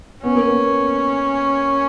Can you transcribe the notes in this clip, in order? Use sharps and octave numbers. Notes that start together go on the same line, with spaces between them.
B3 C#4
A#3
B3